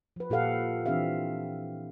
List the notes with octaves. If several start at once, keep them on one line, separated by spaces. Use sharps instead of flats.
F3 B4
A#2 G4 A4 F5 F#5
E3 C4 D4 G4 E5 F5